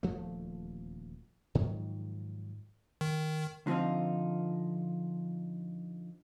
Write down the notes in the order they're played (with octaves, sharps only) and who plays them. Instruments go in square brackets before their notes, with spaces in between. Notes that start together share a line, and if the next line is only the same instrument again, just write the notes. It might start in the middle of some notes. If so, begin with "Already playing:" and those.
[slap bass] D#1 D2 F3 A3
G#2 D#3 F3 F#3
[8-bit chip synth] D#3
[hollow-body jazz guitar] D3 F3 C4 D#4 F4